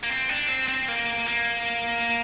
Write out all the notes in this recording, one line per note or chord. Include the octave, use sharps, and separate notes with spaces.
A#3
C4
D4
C4
C4
A#3
A#3